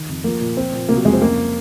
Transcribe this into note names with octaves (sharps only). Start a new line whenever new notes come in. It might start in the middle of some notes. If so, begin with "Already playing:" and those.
Already playing: D#3
F2
F3 A#3
A#2
F3 C4
A#2
C3 A#3
F#3
F2 G#3
C4
C#3 A#3